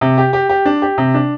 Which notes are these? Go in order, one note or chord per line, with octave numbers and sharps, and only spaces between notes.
C3
G4
G4
G4
D4
G4
C3
D4